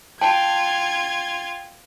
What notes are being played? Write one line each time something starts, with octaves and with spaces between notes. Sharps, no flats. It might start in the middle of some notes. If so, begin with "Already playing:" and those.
F4 G5 A5 G#6